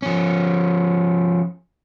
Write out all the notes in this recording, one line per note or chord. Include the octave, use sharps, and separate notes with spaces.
F3 C#4